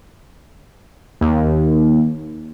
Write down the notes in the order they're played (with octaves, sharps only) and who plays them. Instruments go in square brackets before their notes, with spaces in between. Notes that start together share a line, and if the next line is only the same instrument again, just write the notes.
[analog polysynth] D#2